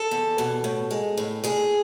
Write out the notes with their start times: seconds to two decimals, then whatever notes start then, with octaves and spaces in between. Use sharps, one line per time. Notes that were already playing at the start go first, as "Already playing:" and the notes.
Already playing: A4
0.11 E2
0.38 B2
0.64 A2
0.91 G#3
1.18 A2
1.44 A2 G#4